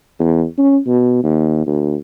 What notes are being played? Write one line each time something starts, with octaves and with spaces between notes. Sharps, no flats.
E2
C#4
B2
D#2
D2